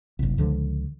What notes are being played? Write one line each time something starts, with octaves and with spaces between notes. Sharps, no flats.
F#1 C2
C#2 D3 F3